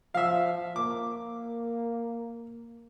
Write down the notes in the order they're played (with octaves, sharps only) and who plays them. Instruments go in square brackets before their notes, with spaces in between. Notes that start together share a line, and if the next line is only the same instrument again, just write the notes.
[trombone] F3 [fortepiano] E5 F5
[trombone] A#3 [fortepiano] D6